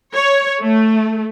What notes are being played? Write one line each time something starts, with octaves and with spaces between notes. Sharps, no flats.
C#5
A3